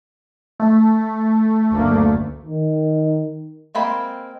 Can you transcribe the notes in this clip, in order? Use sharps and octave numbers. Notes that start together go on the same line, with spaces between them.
A3
F#1 D2 A#3
D#3
G#3 A#3 C4 B5